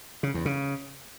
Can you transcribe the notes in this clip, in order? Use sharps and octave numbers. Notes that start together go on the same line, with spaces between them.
C#3
E2
C#3